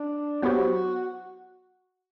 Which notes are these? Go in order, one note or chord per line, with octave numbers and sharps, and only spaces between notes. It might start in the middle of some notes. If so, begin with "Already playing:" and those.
Already playing: D4
F#3 B3 E4 F#4 G4 C5